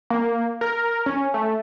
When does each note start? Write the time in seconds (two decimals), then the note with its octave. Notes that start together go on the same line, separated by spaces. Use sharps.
0.10 A#3
0.61 A#4
1.06 C#4
1.34 A3